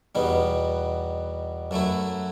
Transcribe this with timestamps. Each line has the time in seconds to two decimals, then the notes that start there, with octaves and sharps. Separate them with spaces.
0.15 E2 B2 G3 B3 D#4
1.71 F#2 F#3 A3 E4